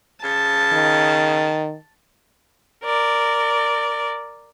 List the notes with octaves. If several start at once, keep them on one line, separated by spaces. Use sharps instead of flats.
C#3 A5
D#3
A#4 D5